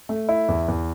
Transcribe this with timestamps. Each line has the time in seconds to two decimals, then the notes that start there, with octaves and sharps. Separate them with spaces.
0.09 A3
0.29 E4
0.48 E2
0.68 E2